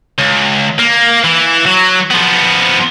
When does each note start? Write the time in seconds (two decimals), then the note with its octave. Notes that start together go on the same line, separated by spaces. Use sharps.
0.18 C#2
0.79 A#3
1.24 E3
1.65 F#3
2.11 F3 B3